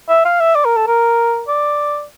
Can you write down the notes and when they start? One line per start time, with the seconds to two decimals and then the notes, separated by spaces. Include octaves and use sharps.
0.09 E5
0.25 F5
0.40 E5
0.55 D5
0.65 A#4
0.77 A4
0.87 A#4
1.48 D5